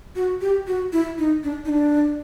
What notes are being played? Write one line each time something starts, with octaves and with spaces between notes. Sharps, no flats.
F#4
G4
F#4
E4
D#4
D4
D#4
D4